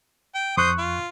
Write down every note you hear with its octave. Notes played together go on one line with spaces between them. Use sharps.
G5
F2 C5 C#6 D#6 F#6
F4